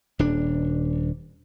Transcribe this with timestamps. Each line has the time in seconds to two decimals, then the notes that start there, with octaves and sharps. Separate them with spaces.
0.19 D#1 D4